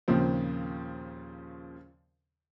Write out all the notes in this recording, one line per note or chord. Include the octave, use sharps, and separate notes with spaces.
D#2 A#2 C#3 F3 C4